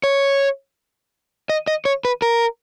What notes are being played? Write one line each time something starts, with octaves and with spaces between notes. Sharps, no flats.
C#5
D#5
D#5
C#5
B4
A#4